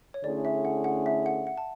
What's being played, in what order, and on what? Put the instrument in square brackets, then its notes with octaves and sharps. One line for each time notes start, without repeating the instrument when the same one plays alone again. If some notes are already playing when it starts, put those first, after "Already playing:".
[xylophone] C#5
[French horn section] D3 A3 C#4 E4 G#4 [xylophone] D5
[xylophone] E5
F#5
F#5
E5
F#5
F#5
A5